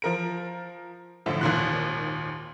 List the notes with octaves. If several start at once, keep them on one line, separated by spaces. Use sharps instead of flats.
F3 A#4 D7
A1 A2 D3 F3
G#1 D#2 A#2 F#6